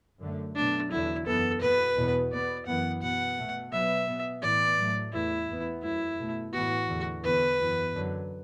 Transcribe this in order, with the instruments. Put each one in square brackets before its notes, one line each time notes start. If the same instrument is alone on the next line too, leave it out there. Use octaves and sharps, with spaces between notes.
[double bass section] F#2 D3 A3
[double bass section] B2 F#3 A3 [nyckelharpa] D4
[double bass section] E2 D3 F#3 [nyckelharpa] E4
[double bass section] F#2 E3 B3 [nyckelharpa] A4
[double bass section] B2 B3 [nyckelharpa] B4
[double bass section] E2 B2 B3
[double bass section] B2 B3 [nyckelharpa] D5
[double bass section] F#2 E3 B3 [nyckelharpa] F#5
[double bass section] B2 B3 [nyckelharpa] F#5
[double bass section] B2 A3
[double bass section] B2 F#3 B3 [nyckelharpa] E5
[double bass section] B2 B3
[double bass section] A2 E3 B3 [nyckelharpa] D5
[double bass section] A2 F#3 A3
[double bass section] E2 E3 A3 [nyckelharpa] E4
[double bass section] E2 E3 B3
[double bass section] F#2 F#3 A3 [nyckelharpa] E4
[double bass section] B2 A3
[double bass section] A2 E3 B3 [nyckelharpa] F#4
[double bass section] E2 D3 A3
[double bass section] E2 D3 B3 [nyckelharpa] B4
[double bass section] F#2 E3 B3
F#2 D3 F#3